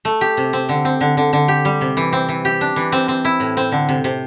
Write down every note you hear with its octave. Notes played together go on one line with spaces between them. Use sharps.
A3
G4
C3
C4
D3
C4
D3
D3
D3
G4
G3
C3
E3
C4
E3
G4
D4
E3
C4
C4
E4
A2
C4
D3
C3
C3